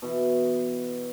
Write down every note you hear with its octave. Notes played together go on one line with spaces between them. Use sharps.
B2 E3